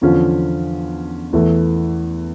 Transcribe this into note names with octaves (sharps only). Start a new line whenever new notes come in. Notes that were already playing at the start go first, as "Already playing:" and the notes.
E2 D3 F3 C#4 F4
E2 E3 A3